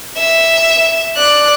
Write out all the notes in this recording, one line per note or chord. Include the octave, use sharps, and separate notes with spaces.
E5
D5 F#6